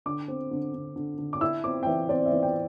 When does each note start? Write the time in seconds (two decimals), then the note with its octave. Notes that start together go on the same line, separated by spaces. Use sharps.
0.06 D3 D6
0.28 C4
0.51 D3
0.74 D3
0.96 D3
1.18 D3
1.33 D6
1.41 E4 E6
1.64 C4 D6
1.83 G5
1.86 E3 E5
2.09 C4 D5
2.26 E5
2.32 E3
2.43 G5